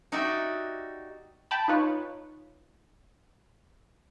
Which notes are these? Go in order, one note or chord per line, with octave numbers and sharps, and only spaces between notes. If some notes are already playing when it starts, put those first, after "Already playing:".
D#4 F#4 G4 D5 E5
G5 A5 B5
D#4 F4 B4 C#5